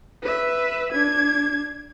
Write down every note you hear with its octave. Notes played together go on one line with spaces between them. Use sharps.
B4 E5
D4 G#6